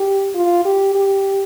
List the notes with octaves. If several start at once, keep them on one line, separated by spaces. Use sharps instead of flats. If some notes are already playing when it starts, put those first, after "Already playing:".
Already playing: G4
F4
G4
G4